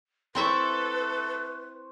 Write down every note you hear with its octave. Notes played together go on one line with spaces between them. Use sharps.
C4 E4 A4 B4 C5 E5 C#6